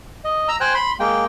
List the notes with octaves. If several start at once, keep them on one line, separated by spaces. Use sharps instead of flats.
D#5
A#5 E6
C5 G5 G#5 F#6
B5 C6
G#3 A#3 G5